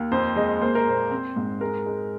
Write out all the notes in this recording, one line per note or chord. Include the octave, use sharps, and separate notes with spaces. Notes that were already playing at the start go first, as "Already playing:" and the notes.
Already playing: D#2
F2 C5
G#3 D#5
A#3 C5
A#4
A#2 C5
C4
G#2
G#3 A#4
G#3